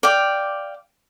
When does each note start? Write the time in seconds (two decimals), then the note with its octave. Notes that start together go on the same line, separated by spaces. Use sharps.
0.03 D5 F5 G5